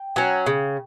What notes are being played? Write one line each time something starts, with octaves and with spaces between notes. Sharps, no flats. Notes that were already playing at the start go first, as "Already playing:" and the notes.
Already playing: G5
F#3 C#4
C#3